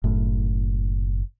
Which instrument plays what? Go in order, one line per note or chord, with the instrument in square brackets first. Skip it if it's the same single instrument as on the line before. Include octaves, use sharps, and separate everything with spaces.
[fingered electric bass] F#1 A2